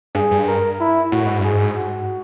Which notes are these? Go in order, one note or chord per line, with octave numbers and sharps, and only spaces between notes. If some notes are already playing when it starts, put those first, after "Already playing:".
G2 G#4
G2
A#4
E4
A2 F#4
G#2
G2 G#4
G#2
F#4